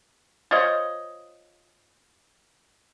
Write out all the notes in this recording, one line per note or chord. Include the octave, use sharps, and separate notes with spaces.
F4 C5 C#5 D#5